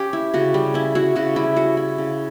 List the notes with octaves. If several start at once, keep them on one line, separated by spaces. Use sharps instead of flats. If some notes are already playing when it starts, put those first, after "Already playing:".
Already playing: C#4 G4
E4
C#3 F#4
G3
C#4 E4
E4 F#4
C#3 F#4
G3 E4
C#4 F#4
E4
C#3